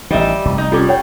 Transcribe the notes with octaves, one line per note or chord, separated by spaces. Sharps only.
A1 D#3 G3 D#5 E5
F1 C2
D#4
G3 C#4 F4 A4 D6
C#5 F#5 G5